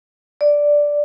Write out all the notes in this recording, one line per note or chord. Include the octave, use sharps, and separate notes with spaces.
D5